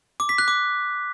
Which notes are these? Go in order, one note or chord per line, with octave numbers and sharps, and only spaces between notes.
D6
B6
F#6
D6